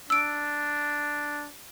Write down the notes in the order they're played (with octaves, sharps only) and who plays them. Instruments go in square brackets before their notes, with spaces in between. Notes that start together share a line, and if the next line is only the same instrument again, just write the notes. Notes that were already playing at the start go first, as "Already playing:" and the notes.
[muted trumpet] D4 [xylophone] E6 D7